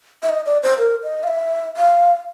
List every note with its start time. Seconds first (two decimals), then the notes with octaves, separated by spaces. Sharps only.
0.23 E5
0.29 D#5
0.46 D5
0.63 C5
0.78 A#4
1.03 D#5
1.23 F5
1.27 E5
1.77 F5